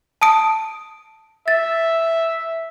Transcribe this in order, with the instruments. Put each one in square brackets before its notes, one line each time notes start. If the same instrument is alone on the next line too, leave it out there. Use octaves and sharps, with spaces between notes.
[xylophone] A5 D#6 D7
[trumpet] E5 [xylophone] A6